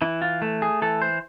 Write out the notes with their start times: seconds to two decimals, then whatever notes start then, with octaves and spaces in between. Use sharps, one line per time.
0.02 E3 E4
0.22 F4
0.42 A3
0.62 G#4
0.82 E3 A4
1.02 C5